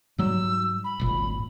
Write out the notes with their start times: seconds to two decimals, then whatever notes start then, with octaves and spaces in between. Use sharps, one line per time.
0.18 G#2 F#3 G3 E6
0.84 B5
1.00 D#1 G#1 A#2